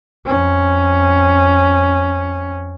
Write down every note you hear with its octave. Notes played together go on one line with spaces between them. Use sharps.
F2 C#4